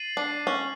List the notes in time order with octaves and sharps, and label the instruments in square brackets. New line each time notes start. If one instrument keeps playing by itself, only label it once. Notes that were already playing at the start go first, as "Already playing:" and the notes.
Already playing: [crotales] A6 C7 D#7 F#7
[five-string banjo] D4
C#4